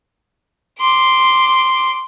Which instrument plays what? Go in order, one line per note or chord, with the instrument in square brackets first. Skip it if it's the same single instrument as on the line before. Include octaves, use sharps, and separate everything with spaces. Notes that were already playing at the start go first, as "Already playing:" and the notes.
[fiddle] C6 D6